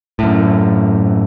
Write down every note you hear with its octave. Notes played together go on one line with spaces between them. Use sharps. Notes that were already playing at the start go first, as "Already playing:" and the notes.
F#2 A2